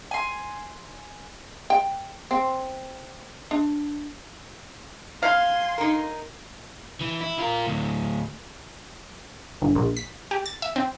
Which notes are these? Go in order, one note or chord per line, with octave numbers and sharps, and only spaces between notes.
G#5 C6
G5
C4
D4
F5 G#5 C6
D#4 A#4
E3
E4
F4 A#4
D2 A2
G1
A#1
B6
G4
A6
E5
C4